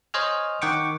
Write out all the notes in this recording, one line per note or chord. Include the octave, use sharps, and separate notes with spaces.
C5 C#5 D#5 G#5 F6
D#3 F#5 G5 C#6 D6